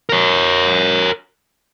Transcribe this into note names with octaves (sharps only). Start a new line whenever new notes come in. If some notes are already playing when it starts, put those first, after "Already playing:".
A#4 C#5